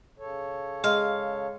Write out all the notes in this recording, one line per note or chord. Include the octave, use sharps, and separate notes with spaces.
C#3 A4 C#5
G#3 F5